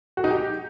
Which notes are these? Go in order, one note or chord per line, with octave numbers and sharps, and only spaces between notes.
F#4
D#4
G4